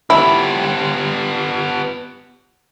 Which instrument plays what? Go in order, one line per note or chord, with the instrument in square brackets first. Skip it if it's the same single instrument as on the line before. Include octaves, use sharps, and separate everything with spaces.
[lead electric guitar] B3 G4 [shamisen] E4